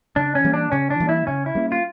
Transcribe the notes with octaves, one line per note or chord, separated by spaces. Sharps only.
C#3 D4
C#4
E3 G3 A#3
D4
C#3 C#4
D4
E3 G3 A#3
E4
C#3 C#4
E4
G3 A#3 C#4
F4